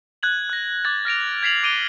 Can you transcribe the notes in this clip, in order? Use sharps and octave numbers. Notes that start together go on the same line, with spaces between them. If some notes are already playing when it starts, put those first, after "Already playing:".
F#6 G#6 F#7
F#6 A#6
D6 F#6 G#6 A6 F#7
F6 A#6 D7 F7
G#6 B6 C7 F7 F#7
D6 D7 D#7 F7 G7